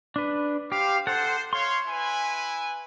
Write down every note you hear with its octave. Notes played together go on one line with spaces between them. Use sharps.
D4 B4
G4 C5 F5
A4 C5 F#5
C#5 F5 C6
E4 B4 G#5